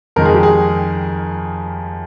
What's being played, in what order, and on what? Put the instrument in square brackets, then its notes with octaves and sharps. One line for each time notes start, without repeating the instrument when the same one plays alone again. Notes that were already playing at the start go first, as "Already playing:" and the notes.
[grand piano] F2 D#3 G#3 A#4
G#4
G4
G#4